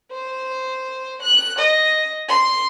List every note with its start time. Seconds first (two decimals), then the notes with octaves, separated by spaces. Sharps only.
0.12 C5
1.23 F#6
1.58 D#5
2.29 C6